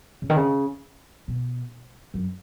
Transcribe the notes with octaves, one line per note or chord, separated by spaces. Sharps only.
C#3
D#3
C#3
B2
F#2